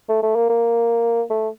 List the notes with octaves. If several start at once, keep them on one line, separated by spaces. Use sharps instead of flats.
A3
A3
A#3
A#3
A3